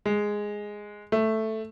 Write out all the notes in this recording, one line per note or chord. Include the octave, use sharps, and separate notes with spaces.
G#3
A3